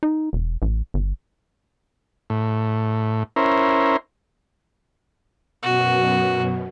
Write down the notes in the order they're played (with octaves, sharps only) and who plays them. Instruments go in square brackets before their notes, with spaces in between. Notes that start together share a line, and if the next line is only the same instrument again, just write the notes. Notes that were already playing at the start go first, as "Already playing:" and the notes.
[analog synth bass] D#4
E1
A1
G1
[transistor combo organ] A2
C#4 E4 A#4 C5
[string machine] F#2 B2 [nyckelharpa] F#4